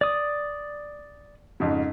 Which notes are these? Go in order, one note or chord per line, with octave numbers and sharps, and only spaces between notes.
D5 D#6
F2 G#2 C#3